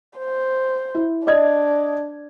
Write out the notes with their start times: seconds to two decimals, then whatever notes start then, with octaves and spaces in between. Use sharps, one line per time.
0.18 C5
0.95 E4
1.27 D4 D5 D#5 G#6